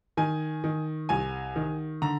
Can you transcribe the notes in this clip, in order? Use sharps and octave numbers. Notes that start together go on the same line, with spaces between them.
D#3 G#5
D#3
C2 G#5
D#3
D3 A#5